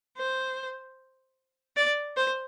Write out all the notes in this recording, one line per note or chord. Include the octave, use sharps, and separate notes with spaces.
C5
D5
C5